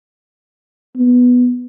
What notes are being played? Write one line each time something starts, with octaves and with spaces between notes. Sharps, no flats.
B3